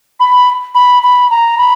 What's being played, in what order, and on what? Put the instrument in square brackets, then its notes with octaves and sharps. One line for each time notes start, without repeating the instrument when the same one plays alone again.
[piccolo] B5
B5
B5
A#5
B5